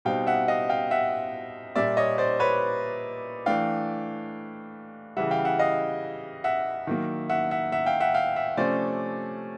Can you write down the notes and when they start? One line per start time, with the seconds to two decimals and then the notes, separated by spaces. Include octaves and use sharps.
0.05 B2 G3 C4 D#4 F5 G5
0.27 E5 F#5
0.48 D#5 F5
0.69 F5 G5
0.91 E5 F#5
1.76 A#2 G3 A#3 D5 E5
1.97 C#5 D#5
2.18 C5 D5
2.39 B4 C#5
3.46 E3 A3 D4 F5 G5
5.17 C#3 E3 G3 E5 F#5
5.31 F5 G5
5.45 E5 F#5
5.59 D#5 F5
6.44 E5 F#5
6.87 D#3 F#3 A#3
7.30 E5 F#5
7.51 E5 F#5
7.72 E5 F#5
7.86 F5 G5
8.00 E5 F#5
8.14 F5 G5
8.36 E5 F#5
8.57 C3 F3 A3 C#4 C5 D5